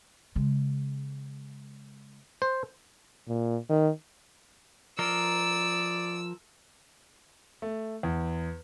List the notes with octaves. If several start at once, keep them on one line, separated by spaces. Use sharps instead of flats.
C#3 G#3
C5
A#2
D#3
F3 A#4 D5 D#5 E6
A3
E2